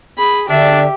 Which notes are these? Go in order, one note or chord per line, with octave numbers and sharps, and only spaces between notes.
G#4 B5
D3 D4 G4 E5